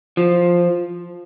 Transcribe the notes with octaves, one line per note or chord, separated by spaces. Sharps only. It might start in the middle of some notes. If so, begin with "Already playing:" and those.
F3